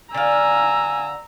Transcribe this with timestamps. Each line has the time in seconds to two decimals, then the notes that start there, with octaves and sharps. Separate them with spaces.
0.14 D3 F5 G#5 A#5 E6